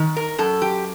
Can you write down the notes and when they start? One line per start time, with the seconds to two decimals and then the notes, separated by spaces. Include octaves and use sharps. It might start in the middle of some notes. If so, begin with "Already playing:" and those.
Already playing: D#3
0.17 A#4
0.38 F#2 A4
0.62 G4